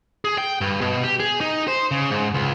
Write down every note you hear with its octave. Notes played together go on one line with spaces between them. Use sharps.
G#4
G5
G2
B2
G4
G#4
D#4
C5
C#3
G#2
C#2